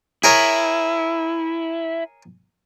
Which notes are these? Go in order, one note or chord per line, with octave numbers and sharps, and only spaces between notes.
E4 G#4 A#4 C#5